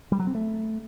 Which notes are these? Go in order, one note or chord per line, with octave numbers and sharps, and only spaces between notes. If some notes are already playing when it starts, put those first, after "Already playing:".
G3
F#3
C4
A3